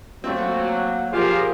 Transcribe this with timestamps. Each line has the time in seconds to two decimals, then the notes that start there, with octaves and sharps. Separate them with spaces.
0.24 F#3 A3 A#3 C4
1.13 A#2 F3 F4 G4 G#4 A#4 C5 F5